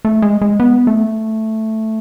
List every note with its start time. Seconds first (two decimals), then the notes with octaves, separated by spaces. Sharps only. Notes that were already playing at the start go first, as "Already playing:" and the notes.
0.05 A3
0.22 G#3
0.42 G#3
0.60 B3
0.87 A3